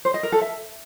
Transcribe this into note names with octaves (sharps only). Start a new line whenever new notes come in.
C5
D#5
A#4
A4
E5